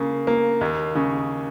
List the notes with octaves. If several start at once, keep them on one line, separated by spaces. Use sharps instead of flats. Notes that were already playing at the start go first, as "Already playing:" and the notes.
Already playing: C#3 A#3
A#3
D#2
C#3